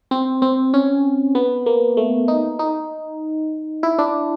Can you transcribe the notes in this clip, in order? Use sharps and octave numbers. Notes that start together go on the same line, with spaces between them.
C4
C4
C#4
B3
A#3
A3
D#4
D#4
E4
D4